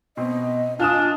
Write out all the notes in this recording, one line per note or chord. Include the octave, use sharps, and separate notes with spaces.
B2 C4 D#5
D4 F4 G#5 D#6 F6 E7